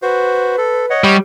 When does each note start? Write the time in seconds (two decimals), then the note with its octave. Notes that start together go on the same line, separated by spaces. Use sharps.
0.02 F#4 B4 C5
0.58 A4
0.90 C#5 D#5 F#5
1.04 G3 C#6